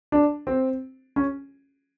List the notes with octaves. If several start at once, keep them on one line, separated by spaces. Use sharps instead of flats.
D4
C4
C#4